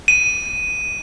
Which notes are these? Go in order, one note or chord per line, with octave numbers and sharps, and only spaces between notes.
D#7